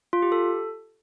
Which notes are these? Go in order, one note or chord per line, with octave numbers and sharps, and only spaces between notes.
F4
G4
A4